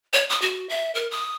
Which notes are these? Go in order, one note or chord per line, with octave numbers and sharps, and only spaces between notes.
C#5
D#6
F#4
E5
A#4
D#6